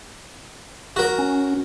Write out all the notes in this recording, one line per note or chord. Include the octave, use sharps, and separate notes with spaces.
F#4 A#4
C#4